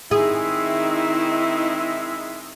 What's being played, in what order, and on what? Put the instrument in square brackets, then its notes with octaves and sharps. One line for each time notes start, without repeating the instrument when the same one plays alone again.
[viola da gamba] D#3 C4 D#4 [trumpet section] G#3 E5 [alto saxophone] E4 [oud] G#4